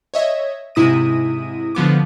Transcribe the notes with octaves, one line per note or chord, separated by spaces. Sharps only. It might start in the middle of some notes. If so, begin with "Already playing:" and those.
C#5 D#5 E5 G#6
G#2 C3 E4 D#6 A#6 D#7
D3 F3 B3 D6